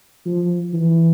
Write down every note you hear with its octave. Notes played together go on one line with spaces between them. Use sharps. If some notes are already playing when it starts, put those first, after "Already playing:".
F3
E3